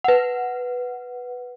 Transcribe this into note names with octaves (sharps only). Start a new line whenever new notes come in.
B4 F#5